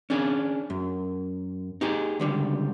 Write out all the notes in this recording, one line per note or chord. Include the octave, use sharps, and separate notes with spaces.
C#4 D4 G#4
F#2
D#4 G4 G#4
C#2 D3 G3